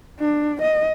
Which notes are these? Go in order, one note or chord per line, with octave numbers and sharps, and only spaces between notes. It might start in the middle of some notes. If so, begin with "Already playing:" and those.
D4
D#5